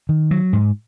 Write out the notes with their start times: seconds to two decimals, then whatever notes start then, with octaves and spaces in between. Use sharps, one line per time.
0.09 D#3
0.31 F#3
0.53 G#2